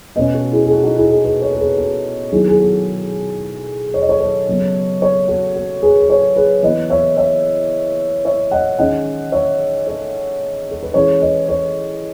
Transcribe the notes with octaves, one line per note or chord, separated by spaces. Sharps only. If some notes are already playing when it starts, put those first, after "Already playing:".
B2 A3 C#4 B4 D#5
F#4 A4
E4 G#4
G#4
F#4 A4
D#4 F#4
E4 G#4
E4 G#4
G#4 B4
A4 C#5
A4
G#4 B4
F#4 A4
D#3 F#3 B3 E4 G#4
G#4
F#4 A4
C#5
D#5
A4 C#5
A4 C#5
C#3 F#3 B3
A4 C#5
F#4 A4
F#4 A4
G#4 B4
B4
A4 C#5
G#4 B4
E3 B3 B4 D#5
C#5 E5
C#5 E5
C#5 E5
D#5 F#5
D#3 G#3 C#4 D#5 F#5
C#5 E5
A4 C#5
A4
B4
E3 G#3 C#4 A4 C#5
B4 D#5
A4 C#5